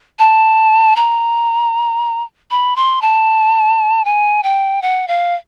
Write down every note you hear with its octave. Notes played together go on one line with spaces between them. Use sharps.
A5
A#5
B5
C6
A5
G#5
G5
F#5
F5